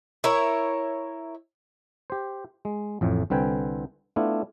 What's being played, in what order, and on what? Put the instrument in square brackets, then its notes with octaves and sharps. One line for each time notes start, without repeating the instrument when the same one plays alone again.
[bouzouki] E4 A#4 C#5
[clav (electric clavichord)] G4 C5
G#3
A1 F2 A2
C2 D3 C4 B4 G5 G#5
A3 B3 D4 E4 F4